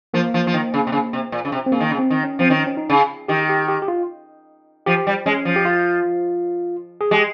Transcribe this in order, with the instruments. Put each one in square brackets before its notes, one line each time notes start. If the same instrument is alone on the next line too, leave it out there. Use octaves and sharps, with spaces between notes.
[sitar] F3 [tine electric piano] A#3
[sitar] F3
F3
D#3
C#3
C3
C#3
C3
A#2
C#3
C3
[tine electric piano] C4
[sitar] C#3 [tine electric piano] A#3
[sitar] D#3
C#3
[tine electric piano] C4
[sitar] D#3
[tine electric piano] C#4
[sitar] F3 [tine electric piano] C4
[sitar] D#3 [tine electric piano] C#4
[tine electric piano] C#4
D#4
[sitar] C#3
[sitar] D#3 [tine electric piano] G4
[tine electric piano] G4
G4
G4
F4
[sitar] F3 [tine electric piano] G4
[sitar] G3
[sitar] G#3 [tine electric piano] C#4
[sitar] F3
[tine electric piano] G4
F4
G#4
[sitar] G#3 [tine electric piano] G4